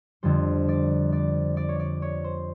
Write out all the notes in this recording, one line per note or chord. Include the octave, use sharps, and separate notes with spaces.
F2 D3 G3 C5
D5
D5
D5
C#5
D5
C#5
C5